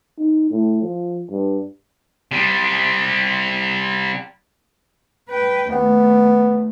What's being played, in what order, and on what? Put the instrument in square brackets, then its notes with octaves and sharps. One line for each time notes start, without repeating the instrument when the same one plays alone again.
[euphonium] D#4
A2
F3
G2
[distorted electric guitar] C3 G3
[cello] B4 G5
[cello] D#2 A3 [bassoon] B3